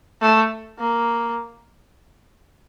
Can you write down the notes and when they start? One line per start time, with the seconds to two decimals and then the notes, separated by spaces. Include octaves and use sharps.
0.21 A3
0.79 A#3